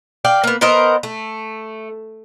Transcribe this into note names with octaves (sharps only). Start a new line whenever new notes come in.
D5 F5 G5
A#3 B3
B3 A#4 C5 D#5
A3